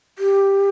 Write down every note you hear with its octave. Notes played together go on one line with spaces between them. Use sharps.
G4